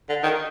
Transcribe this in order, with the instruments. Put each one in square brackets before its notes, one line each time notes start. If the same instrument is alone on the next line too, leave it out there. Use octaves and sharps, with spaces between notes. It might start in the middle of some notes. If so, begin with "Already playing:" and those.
[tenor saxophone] D3
D#3